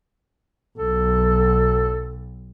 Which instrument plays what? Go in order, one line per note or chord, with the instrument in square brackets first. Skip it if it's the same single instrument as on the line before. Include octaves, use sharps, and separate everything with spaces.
[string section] B1 [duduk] A4